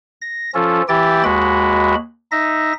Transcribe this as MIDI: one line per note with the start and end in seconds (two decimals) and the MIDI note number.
0.22 0.51 94
0.54 0.82 53
0.54 0.82 61
0.54 0.82 65
0.54 0.82 69
0.88 1.23 52
0.88 1.23 64
0.88 1.23 67
0.88 1.23 79
0.88 1.23 93
1.24 1.95 39
1.24 1.95 56
1.24 1.95 66
1.24 1.95 83
2.32 2.73 63
2.32 2.73 76
2.32 2.73 94